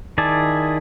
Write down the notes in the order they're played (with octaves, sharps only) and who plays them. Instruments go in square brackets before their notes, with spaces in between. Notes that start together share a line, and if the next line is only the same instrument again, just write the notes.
[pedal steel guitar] D#3 E4 G#4 D5 A5